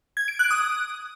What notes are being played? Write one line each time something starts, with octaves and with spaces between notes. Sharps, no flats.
G#6
D7
F#6
D#6